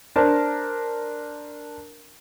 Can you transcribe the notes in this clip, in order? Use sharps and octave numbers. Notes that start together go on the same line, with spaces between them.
D4 A#4 C5 A5